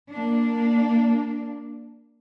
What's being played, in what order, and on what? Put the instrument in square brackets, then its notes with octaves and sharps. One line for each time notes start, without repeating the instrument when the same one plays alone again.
[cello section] A#3 D4